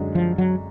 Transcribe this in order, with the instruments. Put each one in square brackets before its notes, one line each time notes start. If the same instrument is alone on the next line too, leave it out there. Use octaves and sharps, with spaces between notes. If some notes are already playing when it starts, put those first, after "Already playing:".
Already playing: [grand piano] F#2 D3 G#3 D4
[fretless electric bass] F3
F#3